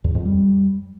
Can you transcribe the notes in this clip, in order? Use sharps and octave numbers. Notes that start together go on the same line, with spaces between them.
E2
F2
G3